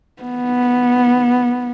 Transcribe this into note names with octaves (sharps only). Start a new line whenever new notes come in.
B3